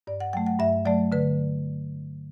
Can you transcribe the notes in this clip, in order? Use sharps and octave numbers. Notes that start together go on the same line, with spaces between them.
G2 D5
F#5
F#3 A3 G5
F#5
G2 E5
F#3 A3 D5
D3 B4